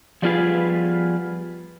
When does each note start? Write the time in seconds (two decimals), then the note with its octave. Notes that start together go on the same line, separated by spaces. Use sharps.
0.22 F3 G3 B3 F4 G#4 B4